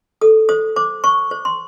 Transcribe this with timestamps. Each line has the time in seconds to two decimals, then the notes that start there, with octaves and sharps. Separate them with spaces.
0.21 A4 D#6
0.49 C5 D#6
0.76 C5 D6
1.04 C5 C#6
1.31 C5
1.45 C6